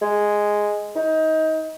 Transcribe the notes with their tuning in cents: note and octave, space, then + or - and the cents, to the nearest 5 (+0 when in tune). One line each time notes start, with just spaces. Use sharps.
G#3 +0
D#4 +25